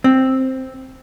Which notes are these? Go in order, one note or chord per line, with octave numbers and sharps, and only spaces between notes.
C4